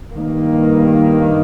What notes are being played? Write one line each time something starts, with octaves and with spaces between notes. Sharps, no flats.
G2 D#3 A#3